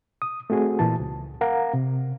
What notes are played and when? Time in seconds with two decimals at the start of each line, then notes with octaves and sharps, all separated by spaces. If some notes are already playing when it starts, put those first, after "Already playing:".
0.22 D#6
0.50 A3 C4 F#4 G#4
0.79 A#2 E3 A5
1.00 C#2
1.41 A#4 F5 F#5 A#5
1.73 C3